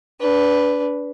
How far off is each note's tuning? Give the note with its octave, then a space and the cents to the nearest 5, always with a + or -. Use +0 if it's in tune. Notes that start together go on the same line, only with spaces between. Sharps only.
D4 -20 B4 +0